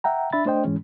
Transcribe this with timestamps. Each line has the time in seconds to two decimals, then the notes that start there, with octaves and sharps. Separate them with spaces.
0.04 E5 F#5 G5 A#5
0.33 D4 E5 B5 A6
0.46 A3 D4 C5 D#5 G5
0.64 G#2 E3 G#3 C#4